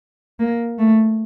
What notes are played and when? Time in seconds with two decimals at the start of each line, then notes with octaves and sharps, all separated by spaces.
0.40 A#3
0.78 A3